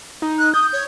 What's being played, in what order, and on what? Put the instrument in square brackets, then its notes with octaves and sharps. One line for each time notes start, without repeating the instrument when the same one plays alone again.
[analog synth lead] D#4
[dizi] F#6
[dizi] D#6 [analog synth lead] G6
[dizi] C#5